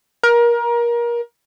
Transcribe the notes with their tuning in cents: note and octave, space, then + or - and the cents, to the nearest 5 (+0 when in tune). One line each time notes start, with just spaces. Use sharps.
A#4 +25